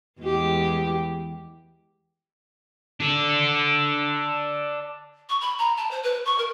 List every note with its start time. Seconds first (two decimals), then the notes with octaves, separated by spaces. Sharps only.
0.21 E2 G#3 G4
3.00 D4 A4
5.29 C#6
5.41 B5
5.58 A#5
5.77 A5
5.91 C5
6.03 B4
6.25 C#6
6.38 A#4